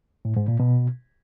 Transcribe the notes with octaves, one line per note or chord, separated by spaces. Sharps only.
A2
G#2
A#2
B2